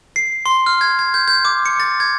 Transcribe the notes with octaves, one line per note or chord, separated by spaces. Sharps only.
C7
C6
F6
G#6
G#6
G6
G6
D6
C#7
A6
G#6